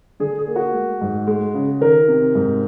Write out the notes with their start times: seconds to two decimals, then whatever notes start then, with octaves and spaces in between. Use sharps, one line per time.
0.20 D3 G#4
0.39 G#4
0.47 A#3
0.56 F#4
0.74 G#3
1.01 G#2
1.27 G#3
1.54 C#3
1.81 D#3 A#4
2.08 C3
2.35 G#2